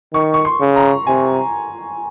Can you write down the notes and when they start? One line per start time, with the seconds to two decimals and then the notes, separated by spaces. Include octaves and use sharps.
0.14 D#3 C#6
0.34 C#6
0.45 C6
0.60 C#3
0.76 A#5
1.07 C3 G#5